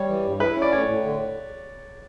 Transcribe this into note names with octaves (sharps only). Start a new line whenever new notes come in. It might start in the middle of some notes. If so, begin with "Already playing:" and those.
Already playing: G3 C#5
E3
G2
E4 B4
C#4
D5
A2 C#5
A2
D3